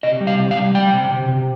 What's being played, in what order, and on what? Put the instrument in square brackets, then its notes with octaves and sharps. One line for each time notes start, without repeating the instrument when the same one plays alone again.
[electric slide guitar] C3 D#5
G3
F5
C3
F5
G3
G3 G5
C3
C3
C3